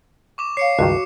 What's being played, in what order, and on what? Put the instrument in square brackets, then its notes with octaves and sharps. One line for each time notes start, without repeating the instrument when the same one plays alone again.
[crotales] C#6 D6 E7
[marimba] C#5 F5 [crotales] C7 C#7
[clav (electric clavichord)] C#2 G2 D#3 [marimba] F#4